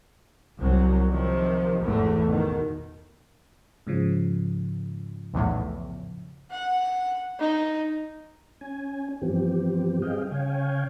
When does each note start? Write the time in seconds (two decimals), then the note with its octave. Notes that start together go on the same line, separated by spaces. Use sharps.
0.58 C2 F#3
1.09 C3 D#3 F3
1.82 G#1 E2 A2 E3 A3
2.28 B2 D#3
3.87 G#2 C#3 F3
5.33 B1 E2 A2
6.52 F#5
7.40 D#4
8.61 C#4 G#5
9.22 G2 E3 F3 B3 C4 G4
10.02 G3 C4 G#4 D#5 F5 G5
10.31 C#3 C#5 F5 G5 G#5